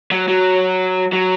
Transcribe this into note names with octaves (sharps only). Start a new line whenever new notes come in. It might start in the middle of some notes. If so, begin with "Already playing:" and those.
F#3
F#3
F#3